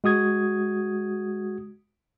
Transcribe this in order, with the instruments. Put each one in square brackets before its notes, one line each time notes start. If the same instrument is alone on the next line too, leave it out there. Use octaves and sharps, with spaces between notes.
[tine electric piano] G#3 F#4 D#6 G#6